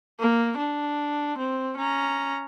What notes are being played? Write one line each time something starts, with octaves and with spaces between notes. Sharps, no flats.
A#3
D4
C4
C#4 A#5